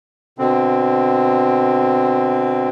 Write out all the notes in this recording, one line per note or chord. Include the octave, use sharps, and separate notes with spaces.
B2 D3 C4